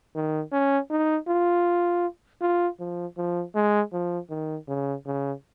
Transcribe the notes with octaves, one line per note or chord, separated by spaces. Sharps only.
D#3
C#4
D#4
F4
F4
F3
F3
G#3
F3
D#3
C#3
C#3